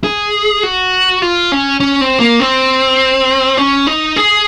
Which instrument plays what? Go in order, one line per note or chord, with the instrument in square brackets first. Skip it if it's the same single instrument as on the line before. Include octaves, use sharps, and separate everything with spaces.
[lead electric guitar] G#4
F#4
F4
C#4
C#4
C4
A#3
C4
C#4
D#4
G#4